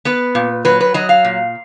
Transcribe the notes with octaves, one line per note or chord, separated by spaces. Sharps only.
B3 B4
A#2
F#3 B4
B4
F#3 D#5
F5
A#2